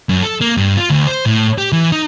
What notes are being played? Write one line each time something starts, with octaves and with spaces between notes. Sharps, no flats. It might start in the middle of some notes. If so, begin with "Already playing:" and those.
F#2
A4
A#3
G2
F4
D2
C5
A2
G4
E3
D#4